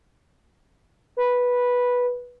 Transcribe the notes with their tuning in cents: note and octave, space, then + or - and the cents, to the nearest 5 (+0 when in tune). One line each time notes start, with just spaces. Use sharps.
B4 -10